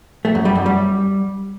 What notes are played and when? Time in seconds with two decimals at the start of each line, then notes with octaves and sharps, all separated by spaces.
0.25 A3
0.35 F#2
0.45 G3
0.55 F#2
0.66 G3